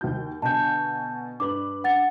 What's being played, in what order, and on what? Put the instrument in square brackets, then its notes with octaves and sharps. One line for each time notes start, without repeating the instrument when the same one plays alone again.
[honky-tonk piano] D#2 F#4 G6
[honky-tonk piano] B2 D3 G#5 [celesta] A5 G6
[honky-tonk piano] G2 B4 F#7 [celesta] D6
[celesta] F#5 A6